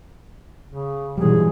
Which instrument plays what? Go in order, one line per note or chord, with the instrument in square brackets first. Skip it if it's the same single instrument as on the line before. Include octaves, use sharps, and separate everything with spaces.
[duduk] C#3
[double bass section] G#2 B2 F#3 [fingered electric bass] E3 G3 [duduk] G#4